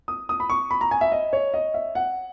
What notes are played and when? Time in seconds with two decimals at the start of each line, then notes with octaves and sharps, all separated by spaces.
0.08 D#6
0.29 D#6
0.40 B5
0.50 C#6
0.71 B5
0.81 A#5
0.91 G#5
1.01 E5
1.12 D#5
1.33 C#5
1.54 D#5
1.74 E5
1.95 F#5